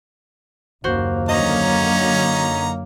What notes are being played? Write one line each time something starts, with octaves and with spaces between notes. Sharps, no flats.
F#1 D#2 A#3 F#4 C5
F#2 D3 F#3 C#4 D#4 D#5 A#5